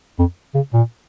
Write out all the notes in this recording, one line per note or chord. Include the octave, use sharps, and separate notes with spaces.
F2
C#3
A#2